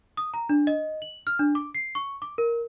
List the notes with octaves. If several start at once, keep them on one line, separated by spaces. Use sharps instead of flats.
D#6
A#5
D4
D#5
F#7
F6
D4
D6
C7
C#6
D6
A#4